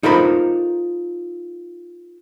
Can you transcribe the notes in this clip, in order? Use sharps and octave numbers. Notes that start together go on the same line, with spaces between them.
D#4 F4 A4 A#4 C5 B5